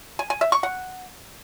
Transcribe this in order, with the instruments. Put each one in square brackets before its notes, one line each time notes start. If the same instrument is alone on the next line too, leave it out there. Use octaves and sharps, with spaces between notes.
[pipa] G#5
G#5
E5
C#6
F#5